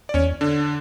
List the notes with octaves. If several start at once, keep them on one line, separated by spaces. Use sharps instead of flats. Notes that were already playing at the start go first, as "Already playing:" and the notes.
D5
E2 C#4 C#5
D3 D4